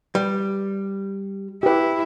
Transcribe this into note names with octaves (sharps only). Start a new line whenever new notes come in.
G3 B4
E4 G4 B4